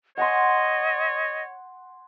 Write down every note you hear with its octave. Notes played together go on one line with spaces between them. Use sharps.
C#5 D#5 F#5 G#5 C6